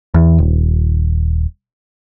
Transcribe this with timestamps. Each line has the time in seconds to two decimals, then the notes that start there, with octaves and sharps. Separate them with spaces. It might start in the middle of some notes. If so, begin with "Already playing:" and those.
0.14 E2
0.38 D#1